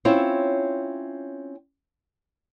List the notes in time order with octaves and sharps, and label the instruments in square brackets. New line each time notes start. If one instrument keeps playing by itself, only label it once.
[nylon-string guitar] C4 C#4 E4 F4 C#5